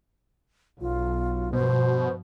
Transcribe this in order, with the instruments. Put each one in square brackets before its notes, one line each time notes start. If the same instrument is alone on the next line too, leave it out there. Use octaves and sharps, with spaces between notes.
[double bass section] B1 F#3 [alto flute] F4
[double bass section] G2 F3 [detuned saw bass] B2 [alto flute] C5